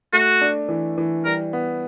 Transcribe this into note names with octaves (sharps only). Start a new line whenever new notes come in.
A3 F#4
D4
E3
E3
G3 A#4
B3